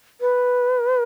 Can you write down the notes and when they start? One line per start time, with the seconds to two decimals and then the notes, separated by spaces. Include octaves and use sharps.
0.21 B4